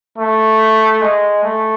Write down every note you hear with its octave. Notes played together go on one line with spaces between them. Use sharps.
A3
G#3
A3